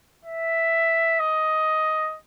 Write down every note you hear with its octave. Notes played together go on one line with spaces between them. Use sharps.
E5
D#5